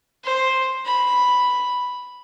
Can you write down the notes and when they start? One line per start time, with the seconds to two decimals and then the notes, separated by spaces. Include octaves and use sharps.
0.24 C5
0.85 B5